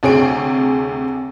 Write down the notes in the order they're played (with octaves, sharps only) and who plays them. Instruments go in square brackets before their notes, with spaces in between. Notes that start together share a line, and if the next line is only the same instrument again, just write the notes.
[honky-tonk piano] D2 C3 G#4 C#5 G5 D7